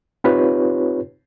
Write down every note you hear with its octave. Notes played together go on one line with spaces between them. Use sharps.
C4 D#4 F4 G4 B4 C#5